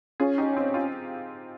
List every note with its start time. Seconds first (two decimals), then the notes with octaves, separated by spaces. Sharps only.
0.20 C#4 F4 G#4
0.38 D#4 G4
0.56 C4 D#4
0.74 F4